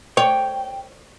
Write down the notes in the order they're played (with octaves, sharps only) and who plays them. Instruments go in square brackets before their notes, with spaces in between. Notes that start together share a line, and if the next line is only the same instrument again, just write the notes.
[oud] C#5 [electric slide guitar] G5